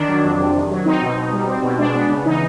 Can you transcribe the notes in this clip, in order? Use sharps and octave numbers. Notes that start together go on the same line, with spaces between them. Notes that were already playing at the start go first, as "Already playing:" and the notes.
Already playing: D#3 D4
F#3
F2
C3
D#3
F#3
C4 D#4
B2
B2
G3
C4
B2
G#3 D4
B3
C#3
E3 D#4